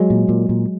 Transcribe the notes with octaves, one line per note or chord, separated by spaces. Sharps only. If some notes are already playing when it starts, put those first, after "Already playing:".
Already playing: F#3 G#3
A#2
A#2
A#2